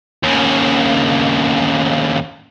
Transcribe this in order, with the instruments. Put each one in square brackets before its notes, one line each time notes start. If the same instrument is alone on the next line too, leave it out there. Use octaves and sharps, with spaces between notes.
[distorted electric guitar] D#2 C#3